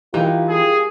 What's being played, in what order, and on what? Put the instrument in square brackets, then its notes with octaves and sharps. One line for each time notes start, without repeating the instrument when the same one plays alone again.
[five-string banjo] E3 D#4 [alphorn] F4 [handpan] G4 A#4
[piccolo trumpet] G#4